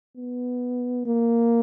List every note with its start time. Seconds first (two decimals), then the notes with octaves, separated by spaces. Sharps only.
0.17 B3
1.06 A#3